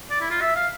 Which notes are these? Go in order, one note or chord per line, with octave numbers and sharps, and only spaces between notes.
D5
E4
F4
E5
F5